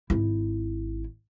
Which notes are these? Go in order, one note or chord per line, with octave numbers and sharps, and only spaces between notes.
G#1 E4